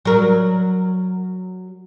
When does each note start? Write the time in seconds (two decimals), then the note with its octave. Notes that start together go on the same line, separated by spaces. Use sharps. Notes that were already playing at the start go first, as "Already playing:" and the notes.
0.05 F#3 A#4